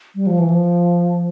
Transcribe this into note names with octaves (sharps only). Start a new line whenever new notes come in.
G3
F3
E3
F3